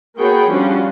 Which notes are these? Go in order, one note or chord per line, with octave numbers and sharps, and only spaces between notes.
A#3 B3 F#4 G#4 C#5 G5
F3 G3 C#4 D4 F4 F#4